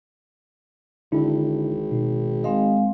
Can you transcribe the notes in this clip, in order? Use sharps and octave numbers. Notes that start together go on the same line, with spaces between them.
G#1 D3 D4 E4
B2 D#4
G#3 C4 D#5 F5